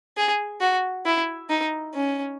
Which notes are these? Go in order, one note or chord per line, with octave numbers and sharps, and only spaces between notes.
G#4
F#4
E4
D#4
C#4